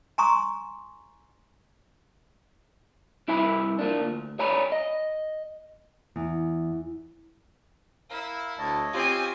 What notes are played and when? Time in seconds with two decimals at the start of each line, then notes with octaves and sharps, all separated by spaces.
0.18 G#5 A#5 C6 C#6 D#6
3.28 C2 E4 E5 G#5 B5
3.79 F3 A#3 D4
4.00 D2
4.39 C#5 D5 G#5 A#5 B5
4.72 D#5
6.16 E2
8.10 E4 A#4 F5
8.58 D2 C#5 D#5 A5
8.94 C4 F4 G4 G#5